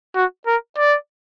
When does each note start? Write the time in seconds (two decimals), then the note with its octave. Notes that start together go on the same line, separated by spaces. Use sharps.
0.16 F#4
0.47 A#4
0.78 D5